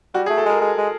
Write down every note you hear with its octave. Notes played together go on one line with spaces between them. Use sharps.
G3 F#4
G#4
A3
A4
G#3 A#4
G#3
G#3